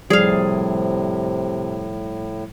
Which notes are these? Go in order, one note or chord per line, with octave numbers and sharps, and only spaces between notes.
A2 C3 F3 G3 G#4 D5 F5